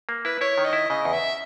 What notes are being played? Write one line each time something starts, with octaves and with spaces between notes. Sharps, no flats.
A#3
E4 B4
E4 C#5
D#3
D#5
E4
C#3 D#5
E2
E5